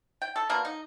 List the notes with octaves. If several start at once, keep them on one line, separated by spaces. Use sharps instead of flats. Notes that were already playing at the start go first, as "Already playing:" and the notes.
G5
A4
B2 A#3 D4 A#4
D#4